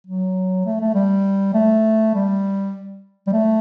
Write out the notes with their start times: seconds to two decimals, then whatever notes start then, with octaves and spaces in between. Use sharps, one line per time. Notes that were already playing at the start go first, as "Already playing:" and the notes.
0.07 F#3
0.65 A3
0.81 A3
0.95 G3
1.54 A3
2.14 G3
3.27 G3
3.33 A3